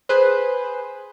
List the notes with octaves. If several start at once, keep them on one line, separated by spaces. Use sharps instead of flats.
G#4 B4 C5